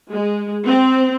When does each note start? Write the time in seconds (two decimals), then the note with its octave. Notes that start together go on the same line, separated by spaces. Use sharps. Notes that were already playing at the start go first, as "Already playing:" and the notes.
0.13 G#3
0.67 C4